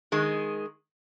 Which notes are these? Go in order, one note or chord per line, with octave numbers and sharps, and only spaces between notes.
D#3 G#3